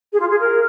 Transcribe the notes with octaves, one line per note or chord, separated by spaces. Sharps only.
G#4
F4
G#4
A#4